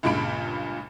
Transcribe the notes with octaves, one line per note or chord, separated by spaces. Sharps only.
C#2 G2 A#2 C#3 B5 D7